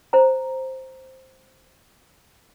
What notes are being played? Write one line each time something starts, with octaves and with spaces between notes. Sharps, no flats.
C5 A#5